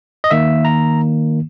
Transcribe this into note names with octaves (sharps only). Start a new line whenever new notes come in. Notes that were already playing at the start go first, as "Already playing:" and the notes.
D#5
D#3 A#3 E5
A#5